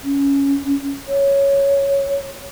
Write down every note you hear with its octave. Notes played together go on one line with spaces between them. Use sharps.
C#4
C#5